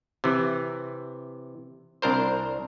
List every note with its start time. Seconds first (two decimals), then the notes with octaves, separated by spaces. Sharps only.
0.24 C3 E3
2.02 C2 D4 A#4 C5